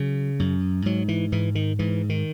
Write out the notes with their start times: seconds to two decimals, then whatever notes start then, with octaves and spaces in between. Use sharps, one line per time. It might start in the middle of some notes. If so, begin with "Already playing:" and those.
Already playing: C#3 F#3
0.40 F#2
0.86 G#2 F#3
1.08 E3
1.32 G#2 E3
1.55 D#3
1.79 G#2 E3
2.09 D#3